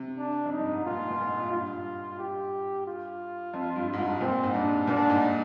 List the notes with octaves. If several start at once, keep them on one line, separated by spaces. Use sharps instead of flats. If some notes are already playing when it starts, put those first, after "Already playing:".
Already playing: C3
D4
F2
D#4
G2
G#2
A#2 F4
A#2
G#2
G2 F4
G4
F4
F2
G2
G#2
G2
A#2 C4
G#2
G2 D4
A#2 D4
G#2